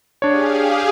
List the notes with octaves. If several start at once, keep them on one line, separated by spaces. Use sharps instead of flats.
D4 G4 G#4 C#5 F5